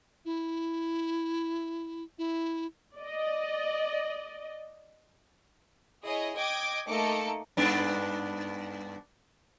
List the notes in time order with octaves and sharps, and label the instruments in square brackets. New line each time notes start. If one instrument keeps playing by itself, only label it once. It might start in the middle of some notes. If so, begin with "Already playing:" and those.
[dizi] E4
E4
[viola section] D5 D#5
[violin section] E4 G#4 C#5 D#5
D#5 G5 D6 G#6
A3 A#3 D#4 A4 D6 C#7
[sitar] G2 B3 D4